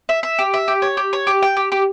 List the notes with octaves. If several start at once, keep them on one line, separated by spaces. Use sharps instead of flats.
E5
E5
G4
E5
G4
C#5
G4
C#5
G4
G5
G4
G4